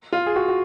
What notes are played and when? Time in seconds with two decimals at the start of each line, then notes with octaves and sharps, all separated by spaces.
0.13 F4
0.26 G#4
0.36 F#4
0.48 F#4